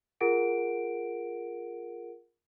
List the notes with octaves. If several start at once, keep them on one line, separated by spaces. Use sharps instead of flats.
F4 G#4 A#4 F#5 D7